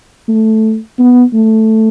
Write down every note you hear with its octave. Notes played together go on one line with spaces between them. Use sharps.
A3
B3
A3